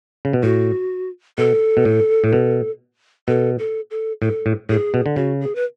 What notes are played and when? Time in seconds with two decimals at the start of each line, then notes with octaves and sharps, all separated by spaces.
0.25 C#3
0.33 B2
0.43 A2 F#4
1.38 B2 A4
1.77 B2
1.85 A2
2.24 A2
2.33 B2
3.28 B2 A4
3.59 A4
3.91 A4
4.22 A2 A4
4.46 A2
4.69 A2 G#4
4.94 B2
5.06 D3
5.16 C#3 F#4
5.41 G#4
5.55 B4